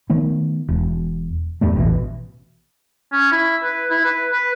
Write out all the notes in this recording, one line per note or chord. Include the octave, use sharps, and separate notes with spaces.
D#3 A3 B3
E1
E2 G2 G3 A3
A1 B2 D3 E3
C#4
E4
B4
E4
B4
B4